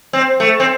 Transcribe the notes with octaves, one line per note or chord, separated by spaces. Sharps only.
C4
A3
C4